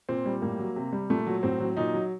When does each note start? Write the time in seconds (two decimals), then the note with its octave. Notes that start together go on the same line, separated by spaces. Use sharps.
0.09 A#2 C4
0.26 G3
0.42 A2 A#3
0.59 F#3
0.76 C3
0.93 G3
1.10 A#2 A3
1.27 F#3
1.43 A2 C4
1.60 F#3
1.77 A#2 D#4
1.93 F#3